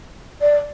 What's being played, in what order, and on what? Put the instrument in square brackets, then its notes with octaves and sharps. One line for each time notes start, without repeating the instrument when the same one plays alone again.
[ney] D5